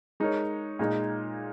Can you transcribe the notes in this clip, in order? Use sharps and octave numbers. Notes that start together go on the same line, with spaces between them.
G#3 D#4 A#4 C#5
A#2 G#3 D#4